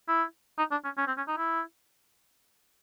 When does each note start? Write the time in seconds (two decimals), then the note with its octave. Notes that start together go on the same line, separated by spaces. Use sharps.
0.08 E4
0.58 D#4
0.71 D4
0.84 C#4
0.98 C#4
1.07 C4
1.17 C#4
1.27 D#4
1.37 E4